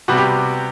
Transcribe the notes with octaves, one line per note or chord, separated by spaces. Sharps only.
C3 G3 B3 F#4
G4